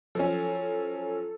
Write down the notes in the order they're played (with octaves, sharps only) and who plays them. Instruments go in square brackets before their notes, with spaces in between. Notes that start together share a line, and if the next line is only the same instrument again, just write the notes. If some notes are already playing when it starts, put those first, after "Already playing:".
[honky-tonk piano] F3 F#3 C#4 [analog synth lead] A4